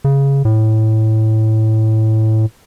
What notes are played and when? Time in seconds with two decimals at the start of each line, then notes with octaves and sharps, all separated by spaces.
0.04 C#3
0.45 A2